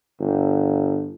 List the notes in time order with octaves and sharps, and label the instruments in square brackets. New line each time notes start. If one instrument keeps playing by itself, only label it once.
[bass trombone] G1